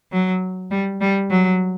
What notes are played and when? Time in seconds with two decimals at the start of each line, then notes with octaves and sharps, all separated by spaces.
0.12 F#3
0.71 G3
1.01 G3
1.30 F#3